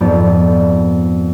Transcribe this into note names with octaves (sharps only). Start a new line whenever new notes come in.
F2 G#2 B3 D5